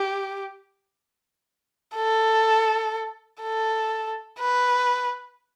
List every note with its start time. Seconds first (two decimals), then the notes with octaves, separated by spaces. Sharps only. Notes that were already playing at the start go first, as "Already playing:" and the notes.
Already playing: G4
1.96 A4
3.42 A4
4.39 B4